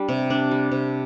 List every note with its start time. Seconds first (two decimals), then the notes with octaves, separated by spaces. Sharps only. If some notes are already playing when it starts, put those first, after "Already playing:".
Already playing: G3 D4
0.09 C3
0.30 D4
0.51 G3
0.72 C3